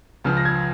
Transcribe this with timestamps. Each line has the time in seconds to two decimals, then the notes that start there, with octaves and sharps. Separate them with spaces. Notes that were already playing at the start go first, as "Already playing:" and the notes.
0.24 C#2 C#3 F3 F6
0.37 A#6
0.45 G#6